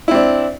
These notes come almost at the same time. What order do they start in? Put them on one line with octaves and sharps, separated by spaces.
E4 C4 D4